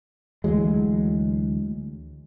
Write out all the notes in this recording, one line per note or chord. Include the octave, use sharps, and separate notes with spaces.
D2 E3 F#3 G#3